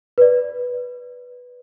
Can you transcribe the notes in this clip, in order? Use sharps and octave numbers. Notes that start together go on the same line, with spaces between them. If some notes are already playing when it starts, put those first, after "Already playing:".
B4 D5